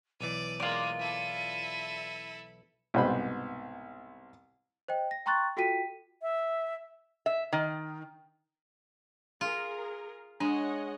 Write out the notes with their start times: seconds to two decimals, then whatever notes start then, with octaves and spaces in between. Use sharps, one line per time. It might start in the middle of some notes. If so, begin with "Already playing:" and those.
0.21 B1 E3 D5 D#7
0.60 G#3 A#3 F4 D5
0.99 E4 A4
2.94 C2 G#2 B2 C5 B5
4.88 C5 D#5 G5
5.11 A#6
5.26 G5 A#5 C6 C#6 F#6 A6
5.57 F4 F#4 A4 G5 B6 D#7
6.22 E5
7.26 E5
7.53 D#3
9.41 F4 G#4 A#4
10.40 G#3 D4 C#5 D#5 F#5